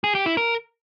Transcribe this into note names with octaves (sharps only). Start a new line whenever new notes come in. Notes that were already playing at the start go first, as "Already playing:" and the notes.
G#4
G4
E4
A#4